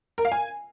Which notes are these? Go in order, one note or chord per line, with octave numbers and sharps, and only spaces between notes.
A#4
F5
G#5